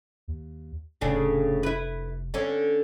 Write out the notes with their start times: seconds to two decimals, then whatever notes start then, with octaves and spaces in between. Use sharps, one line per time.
0.28 D#2
1.01 F1 A2 C#3 D4
1.63 E4 B4
2.34 D3 C#4